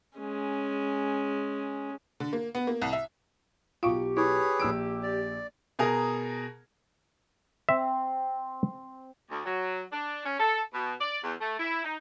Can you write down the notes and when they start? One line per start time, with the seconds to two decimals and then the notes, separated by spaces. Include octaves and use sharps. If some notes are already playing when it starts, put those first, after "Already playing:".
0.19 G#3 C#4
2.20 D3
2.33 A#3
2.55 B3
2.67 A#3
2.82 C2
2.93 E5
3.83 B1 F4 G4 F5 C#6 D7
4.17 E4 G#4 B4 C#5
4.60 A#1 E6 D7
5.03 D5
5.79 B2 G#4 A#4 A#5
7.69 C4 E5
9.30 D2
9.45 F#3
9.92 D4
10.25 C#4
10.39 A4
10.74 B2
11.01 D5
11.24 E2
11.41 A3
11.59 E4
11.84 D#4